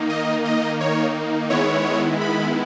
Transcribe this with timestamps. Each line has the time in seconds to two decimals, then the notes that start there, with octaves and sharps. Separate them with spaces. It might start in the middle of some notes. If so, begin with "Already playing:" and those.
Already playing: D#3 A#3 D#4
0.10 D#5
0.45 D#5
0.81 C#5
1.50 D#3 G#3 B3 E4 C#5
2.21 B5